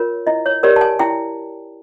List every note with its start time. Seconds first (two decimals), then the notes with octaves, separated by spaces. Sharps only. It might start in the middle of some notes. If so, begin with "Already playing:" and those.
Already playing: F4 A#4 C#5
0.27 E4 D#5
0.46 C#5
0.63 G4 A#4 C#5 D5
0.76 A5
0.81 G#5
0.99 E4 G5